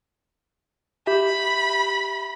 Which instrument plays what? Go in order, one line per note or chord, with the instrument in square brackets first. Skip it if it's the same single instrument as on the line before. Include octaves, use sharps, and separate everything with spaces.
[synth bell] G4 E5 [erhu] B5